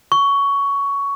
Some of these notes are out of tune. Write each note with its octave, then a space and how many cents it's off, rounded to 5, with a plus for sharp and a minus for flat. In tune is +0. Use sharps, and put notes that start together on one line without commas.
C#6 +15